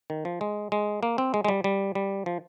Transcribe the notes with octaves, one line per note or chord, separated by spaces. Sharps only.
D#3
F3
G#3
G#3
A#3
C4
G#3
G#3
G3
G3
G3
F3